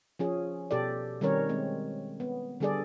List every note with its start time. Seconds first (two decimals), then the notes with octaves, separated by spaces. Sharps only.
0.19 F3 C#4 G#4
0.71 B2 G4 A4 D5
1.21 D#3 G3 C4 C#4 A#4 C#5
1.49 G#3 C4
2.20 B3
2.60 D3 G3 D4 G#4 A4 D5